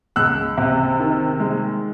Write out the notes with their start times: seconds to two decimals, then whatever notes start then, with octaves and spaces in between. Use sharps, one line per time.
0.16 C#2 E6 F#6
0.58 C3
0.99 D#3
1.40 G#3